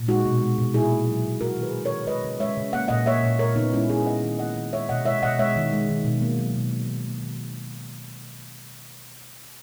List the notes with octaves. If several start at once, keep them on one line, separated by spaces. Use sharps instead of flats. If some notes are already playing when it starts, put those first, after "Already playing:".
Already playing: A#2
G#3 D#4 F#4
B2
G#3
B2
A#2 E4 G#4
A#3
F#3
A#2
G#3 F#4 A#4
D#3
G#4 B4
G#3
D#3 A#4 C#5
G#3 B4 D#5
C#3
G#3 C#5 E5
C#3
A#3 F#5
A#2 D#5 F#5
A#3 C#5 E5
A#2
G#3 A#4 C#5
C#3 B3 D#4
G#3 C#4 E4
C#3 E4 G#4
A#3 D#5 F#5
D#3
A#3 D#5 F#5
D#3
G#3 C#5 E5
B2 D#5 F#5
G#3 C#5 E5
B2 D#5 F#5
G#3 C#5 E5
D#3
G#3
D#3
B2
A#3
F#3
B2
A#3
D#3
A#3
D#3